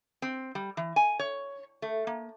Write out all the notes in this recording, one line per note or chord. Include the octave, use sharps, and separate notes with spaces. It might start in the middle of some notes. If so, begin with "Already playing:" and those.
C4
G3
E3
G#5
C#5
A3
A#3